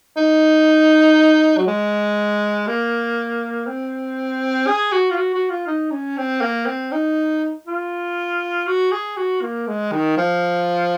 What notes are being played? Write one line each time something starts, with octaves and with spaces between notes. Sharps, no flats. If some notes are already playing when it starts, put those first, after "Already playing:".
D#4
F#3
G#3
A#3
C4
G#4
F#4
F4
F#4
F#4
F4
D#4
C#4
C4
A#3
C4
D#4
F4
F#4
G#4
F#4
A#3
G#3
D#3
F3